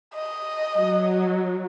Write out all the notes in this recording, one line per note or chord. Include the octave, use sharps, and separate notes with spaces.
D#5
F#3